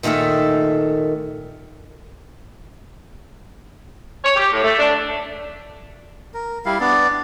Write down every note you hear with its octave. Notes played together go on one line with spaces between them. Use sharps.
A#2 D#3 A3 G#4 E5
C#5
G4
A2
A3
D4
A#4
G3 E4 F5
B3 D4 D5